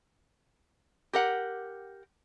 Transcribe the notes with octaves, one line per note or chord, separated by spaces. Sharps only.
G4 A#4 F#5